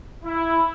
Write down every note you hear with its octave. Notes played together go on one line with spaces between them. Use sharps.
E4